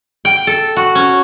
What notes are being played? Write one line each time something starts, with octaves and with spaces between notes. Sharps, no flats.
G5
A4
F#4
C#4